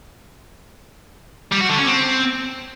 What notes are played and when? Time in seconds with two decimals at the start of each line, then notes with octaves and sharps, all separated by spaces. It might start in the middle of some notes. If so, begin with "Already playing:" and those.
1.52 G3
1.61 F#4
1.70 D3
1.78 C#4
1.87 C4